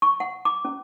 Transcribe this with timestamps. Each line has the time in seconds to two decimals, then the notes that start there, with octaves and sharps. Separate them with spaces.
0.02 C#6
0.20 F#5
0.45 D6
0.65 C#4